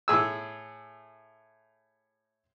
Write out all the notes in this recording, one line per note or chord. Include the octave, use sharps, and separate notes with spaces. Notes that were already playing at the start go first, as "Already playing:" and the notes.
A2 G#4 E6